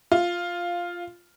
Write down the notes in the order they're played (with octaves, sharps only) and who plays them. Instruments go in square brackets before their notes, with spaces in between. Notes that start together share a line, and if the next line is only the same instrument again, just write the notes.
[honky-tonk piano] F4